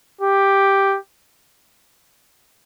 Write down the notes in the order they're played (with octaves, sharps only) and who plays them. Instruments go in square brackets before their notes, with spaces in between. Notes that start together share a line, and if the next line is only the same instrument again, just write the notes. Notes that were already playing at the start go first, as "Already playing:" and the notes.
[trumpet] G4